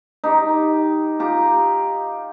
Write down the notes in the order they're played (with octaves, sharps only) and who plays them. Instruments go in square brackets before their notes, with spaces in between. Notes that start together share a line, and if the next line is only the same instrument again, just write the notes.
[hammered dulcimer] D#4 G4
F4 G4 A#5